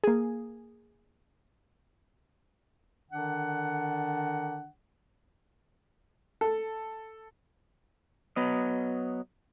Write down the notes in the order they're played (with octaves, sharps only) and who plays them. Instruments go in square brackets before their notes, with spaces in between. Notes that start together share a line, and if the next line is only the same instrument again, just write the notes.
[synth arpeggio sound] A#3 G#4
[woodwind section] D3 D#3 D4 F#5
[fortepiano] A4
[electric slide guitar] F#3 B3 D#5